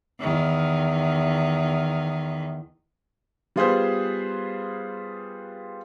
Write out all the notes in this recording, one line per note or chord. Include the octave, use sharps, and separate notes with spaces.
E2 D#3
G3 B3 F4 G#4 B4 C5